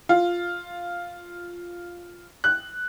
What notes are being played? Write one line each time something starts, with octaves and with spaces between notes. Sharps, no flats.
F4
F#6